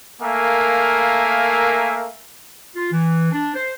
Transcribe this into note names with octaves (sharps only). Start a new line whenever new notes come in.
A3 A#3 A#4 E5 F5 G#5
F4
E3
D4
C5